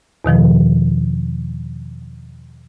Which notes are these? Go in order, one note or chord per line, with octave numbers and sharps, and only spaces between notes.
E2 B2 D#3 F3